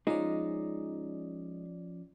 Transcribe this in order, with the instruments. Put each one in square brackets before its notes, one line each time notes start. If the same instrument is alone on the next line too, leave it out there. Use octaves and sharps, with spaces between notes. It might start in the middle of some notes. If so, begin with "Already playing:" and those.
[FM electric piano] F3 C#4 D5 [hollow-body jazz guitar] G#3 D#4